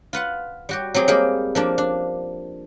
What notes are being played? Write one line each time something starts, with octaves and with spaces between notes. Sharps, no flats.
F4 B4 F#5
G3 F#4 G4
F#3 C4 G4 G#4
G3 G#3 A#3 G4 G#4
F3 A#3 D4
D4